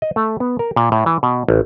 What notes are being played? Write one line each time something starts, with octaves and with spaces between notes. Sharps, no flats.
D#5
A3
B3
A#4
A#2
A2
E3
B2
A1